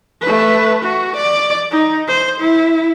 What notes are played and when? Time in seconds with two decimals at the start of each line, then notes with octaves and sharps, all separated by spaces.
0.21 A3 B4
0.83 F#4
1.16 D5
1.71 D#4
2.08 C5
2.41 E4